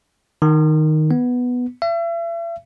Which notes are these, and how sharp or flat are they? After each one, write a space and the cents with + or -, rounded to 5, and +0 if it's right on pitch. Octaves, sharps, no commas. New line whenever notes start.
D#3 -5
B3 +0
E5 +40